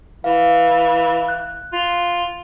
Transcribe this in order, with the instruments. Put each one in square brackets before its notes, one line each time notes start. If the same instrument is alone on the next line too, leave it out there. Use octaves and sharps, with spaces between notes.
[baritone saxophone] E3 [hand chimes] F5
[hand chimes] F#6
[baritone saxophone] F4